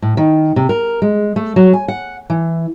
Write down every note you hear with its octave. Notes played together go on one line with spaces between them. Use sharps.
A2
D#3
C3
A#4
G#3
A3
F#3
G#5
F#5
E3